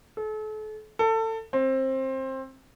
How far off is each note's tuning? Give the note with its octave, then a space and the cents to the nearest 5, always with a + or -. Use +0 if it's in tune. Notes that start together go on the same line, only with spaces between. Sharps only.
A4 -40
A4 +25
C4 +20